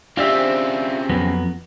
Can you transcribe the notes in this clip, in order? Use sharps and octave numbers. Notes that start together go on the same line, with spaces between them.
C#3 C4 D4 F4 G4 D5 E5
F2 F#3 B3